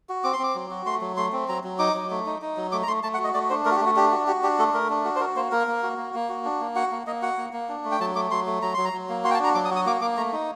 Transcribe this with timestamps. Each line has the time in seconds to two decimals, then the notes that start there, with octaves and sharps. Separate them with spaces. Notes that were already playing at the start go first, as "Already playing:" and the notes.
0.09 F#4
0.24 C4 D6
0.33 C6
0.39 C4 D6
0.55 F#3
0.71 F#4
0.86 A3 C6
1.01 F#3
1.17 A3 C6
1.32 C4
1.48 F#3 A#5
1.64 F#3
1.79 D#4 D6
1.94 F#3
2.10 A3
2.26 D#4
2.42 D#4
2.57 F#3
2.72 A3 D6
2.83 A#5
2.88 A3 C6
3.03 A3 A5
3.14 F#5
3.18 F#4
3.24 D#5
3.34 A3 D5
3.50 D4 C5
3.65 A3 A#4
3.71 F#4
3.76 G4
3.81 A3
3.86 F#4
3.96 D4 G4
4.12 F#4
4.27 F#4 G4
4.43 D4 G4
4.58 A3 A4
4.74 A3 A#4
4.90 D4
5.05 F#4
5.16 C5
5.20 F#4 A#4
5.36 A#3 C5
5.51 A#3 A#4
5.67 A#3
5.83 F#4
5.98 A#3
6.14 A#3
6.29 F#4
6.45 D4
6.61 A#3
6.76 F#4 F#5
6.91 A#3
7.07 A#3 D#5
7.22 F#4 F#5
7.37 A#3
7.53 A#3
7.69 D4
7.85 A3
7.92 G5
8.00 F#3 A5
8.15 A3 D6
8.31 F#3 C6
8.46 A3
8.62 F#3 A#5
8.74 F#3 C6
8.85 A#5
8.93 F#3
9.09 A#3
9.24 F#4 C6
9.31 G5
9.34 A5
9.40 D4 A#5
9.55 F#3 D6
9.65 D#6
9.70 F#4
9.76 D#6
9.86 A#3 D6
10.01 A#3 D6
10.17 A3 A#5
10.33 D#4